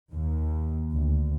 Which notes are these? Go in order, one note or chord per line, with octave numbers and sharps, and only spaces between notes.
D#2
D2